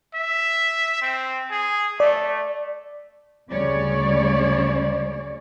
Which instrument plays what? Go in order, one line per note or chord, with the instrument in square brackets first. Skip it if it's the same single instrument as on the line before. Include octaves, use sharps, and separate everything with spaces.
[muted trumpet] E5
C4
G#4
[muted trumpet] A3 [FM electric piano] D5
[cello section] D2 C#3 G3 C#5 D5